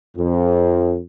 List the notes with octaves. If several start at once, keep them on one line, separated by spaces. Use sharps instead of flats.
F2